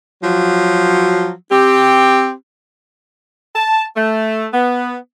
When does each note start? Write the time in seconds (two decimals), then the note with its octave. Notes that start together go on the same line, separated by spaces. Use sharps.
0.23 F3 F#3
1.51 C4 G4
3.55 A5
3.96 A3
4.54 B3